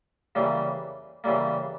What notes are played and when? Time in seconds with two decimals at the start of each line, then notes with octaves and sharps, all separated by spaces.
0.35 C#3 E3 G3 A#3
1.24 C#3 E3 G3 A#3